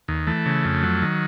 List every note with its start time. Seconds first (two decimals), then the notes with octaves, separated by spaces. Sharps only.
0.08 D#2
0.27 E3 A3
0.46 C#3
0.65 F2
0.83 F#3
1.02 D#3